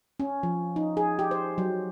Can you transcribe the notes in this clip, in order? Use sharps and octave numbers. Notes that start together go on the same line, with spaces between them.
C#4
F3
D#4
G#4
G4
C5
F#3